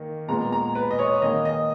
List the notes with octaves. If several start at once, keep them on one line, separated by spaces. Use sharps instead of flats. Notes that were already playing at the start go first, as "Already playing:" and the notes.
Already playing: D#3 A#3
A#2 G#3 B3 A#5
A#5
B4
D#5
C#5
D#3 A#3 D#5
D#5